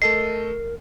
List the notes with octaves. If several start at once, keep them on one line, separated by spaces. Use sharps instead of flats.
A3 A4 A#4 D#5 C7